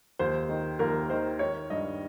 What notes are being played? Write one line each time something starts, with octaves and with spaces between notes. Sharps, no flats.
D#2 C5
D#3
D#2 A#4
D#3 C5
D#3 C#5
G2 D#5